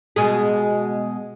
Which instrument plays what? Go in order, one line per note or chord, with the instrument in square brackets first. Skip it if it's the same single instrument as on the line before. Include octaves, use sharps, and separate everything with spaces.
[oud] B2 G#3 G#4